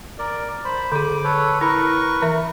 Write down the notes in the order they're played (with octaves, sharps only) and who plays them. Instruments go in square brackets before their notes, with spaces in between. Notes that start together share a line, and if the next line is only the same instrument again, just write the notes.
[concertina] A#4 D5
C5 B5
[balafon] D3 G#4 [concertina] D6
[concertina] A4 B4 C#5
[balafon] E4 [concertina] A#4 B4 C#6
[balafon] E3 E5